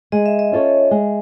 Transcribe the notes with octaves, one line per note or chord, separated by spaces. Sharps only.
G#3 D#5
E5
D#5
C#4 F4 A4 C#5
G#3